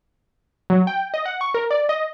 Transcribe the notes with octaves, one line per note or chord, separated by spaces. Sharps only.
F#3
G5
D#5
F#5
C#6
A#4
D5
D#5